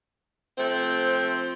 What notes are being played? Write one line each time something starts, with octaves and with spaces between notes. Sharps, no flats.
F3 A3 C4